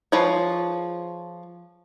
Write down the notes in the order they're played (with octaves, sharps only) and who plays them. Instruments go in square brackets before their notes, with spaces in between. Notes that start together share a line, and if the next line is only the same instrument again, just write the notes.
[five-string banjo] F3 G#4 B4 C#5